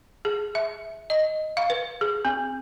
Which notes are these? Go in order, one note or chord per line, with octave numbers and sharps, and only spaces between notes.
G#4
E5
D#5
F5
B4
G#4
C4